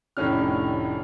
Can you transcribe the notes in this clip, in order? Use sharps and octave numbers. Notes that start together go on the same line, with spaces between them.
F1 A2 D#3 C#4 D4 F6